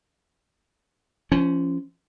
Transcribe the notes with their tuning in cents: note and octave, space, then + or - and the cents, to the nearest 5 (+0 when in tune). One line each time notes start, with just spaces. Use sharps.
F3 -25 C#4 +0